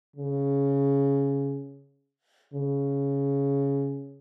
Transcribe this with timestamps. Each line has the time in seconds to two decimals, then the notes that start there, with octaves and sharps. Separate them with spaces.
0.16 C#3
2.54 C#3